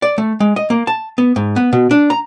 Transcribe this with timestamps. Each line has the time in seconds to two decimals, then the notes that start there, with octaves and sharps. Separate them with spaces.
0.02 D5
0.18 A3
0.40 G#3
0.56 D#5
0.70 A#3
0.87 A5
1.18 B3
1.36 G#2
1.56 B3
1.73 B2
1.91 D4
2.10 A#5